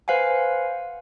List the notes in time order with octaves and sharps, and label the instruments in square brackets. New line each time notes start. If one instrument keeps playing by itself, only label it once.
[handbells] B4 C5 F5 F#5 G#5